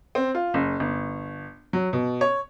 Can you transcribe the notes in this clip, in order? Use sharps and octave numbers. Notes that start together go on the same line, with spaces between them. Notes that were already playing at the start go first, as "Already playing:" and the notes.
C4
F4
F#1
G1
F#3
B2
C#5